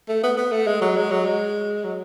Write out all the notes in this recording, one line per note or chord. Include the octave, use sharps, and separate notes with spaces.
A3
B3
B3
A3
G#3
F#3
G#3
F#3
G#3
F#3